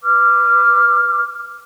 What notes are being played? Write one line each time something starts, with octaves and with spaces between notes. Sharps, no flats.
B4 D6 F6